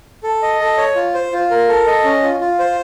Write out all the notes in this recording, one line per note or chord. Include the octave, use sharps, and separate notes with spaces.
A4
D#5
A4
C#5
F4
C5
F4
A#4
A4
D#5
C#4
F4
F4
C5